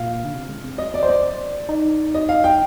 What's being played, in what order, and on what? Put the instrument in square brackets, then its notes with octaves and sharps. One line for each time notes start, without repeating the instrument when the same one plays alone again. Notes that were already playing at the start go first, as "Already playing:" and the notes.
Already playing: [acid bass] A#2 [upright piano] F5
[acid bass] D3
C3
G#3
C4
[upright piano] D#5
D5
C5
D5
[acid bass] D#4
[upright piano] D#5
F5
G5